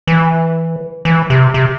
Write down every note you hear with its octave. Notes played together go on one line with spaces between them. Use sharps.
E3
E3
C3
C3